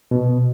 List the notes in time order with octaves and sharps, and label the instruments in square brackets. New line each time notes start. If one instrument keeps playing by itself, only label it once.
[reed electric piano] B2